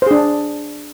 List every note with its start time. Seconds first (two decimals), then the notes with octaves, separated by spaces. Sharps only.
0.02 C5
0.06 G#4
0.11 D4